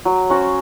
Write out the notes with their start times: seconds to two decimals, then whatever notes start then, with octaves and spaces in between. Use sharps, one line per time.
0.05 F#3
0.30 C#4 F#4 C5